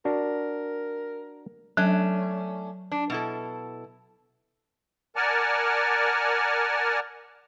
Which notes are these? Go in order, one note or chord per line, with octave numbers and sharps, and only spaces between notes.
D4 F#4 A#4
F#3 A3 C#4 D4
D4
B2 E4 A4
A#4 D5 F#5 G#5 A5 F6